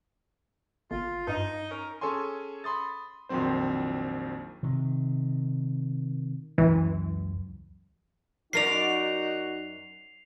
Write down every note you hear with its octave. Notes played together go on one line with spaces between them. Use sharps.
G1 F4
G2 D#4
C#4 A#4
C#4 G#4 A4 C#5 G#5 C6
B5 C6 D#6 A6
A#1 F2 D#3 F#3 C4 C5
C3 D#3
C#2 F#2 E3 F#3
F#2 D#4 F#4 A#4 D5 C7 F7